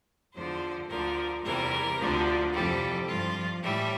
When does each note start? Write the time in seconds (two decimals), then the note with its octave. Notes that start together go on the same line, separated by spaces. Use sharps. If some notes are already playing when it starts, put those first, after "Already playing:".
0.33 E2 D3 F3 C5
0.89 D2 D3 F3 A#4
1.43 E2 C3 E3 G3 A#4
1.98 D2 D3 F3
2.53 F2 C3 E3 G3 A4
3.07 G2 F3 F4
3.62 A2 E3 G3 E5